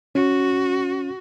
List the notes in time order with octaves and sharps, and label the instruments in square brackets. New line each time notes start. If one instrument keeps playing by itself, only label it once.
[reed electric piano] C#4 [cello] F#4